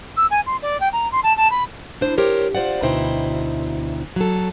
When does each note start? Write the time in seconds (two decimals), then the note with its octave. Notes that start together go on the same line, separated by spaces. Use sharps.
0.17 E6
0.31 G#5
0.46 C6
0.62 D5
0.80 G5
0.93 A#5
1.12 C6
1.23 A5
1.37 A5
1.51 B5
2.01 D4 E4 C5
2.18 G4 A#4 C5 C#5
2.55 F4 C5 D5 F#5
2.82 D2 B2 D#4 E4 C5 G5
4.16 F#3 A4